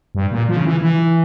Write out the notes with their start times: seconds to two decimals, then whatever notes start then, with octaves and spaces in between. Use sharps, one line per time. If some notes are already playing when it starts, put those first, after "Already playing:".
0.15 G2
0.31 A#2
0.49 F3
0.57 C#3
0.65 E3
0.81 E3